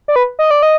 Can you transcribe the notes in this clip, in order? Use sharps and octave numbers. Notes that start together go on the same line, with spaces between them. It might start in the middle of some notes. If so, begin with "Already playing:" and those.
D5
B4
D#5
D5
D#5